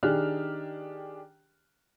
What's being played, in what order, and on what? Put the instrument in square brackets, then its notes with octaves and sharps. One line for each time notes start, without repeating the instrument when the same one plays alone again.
[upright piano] D#3 D4 G4 G#4 F6 F#6